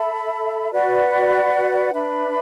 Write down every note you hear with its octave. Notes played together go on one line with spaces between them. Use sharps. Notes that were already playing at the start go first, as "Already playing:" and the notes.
Already playing: A4 E5 B5
F#4 B4 D5 F#5
D4 B4 E5 B5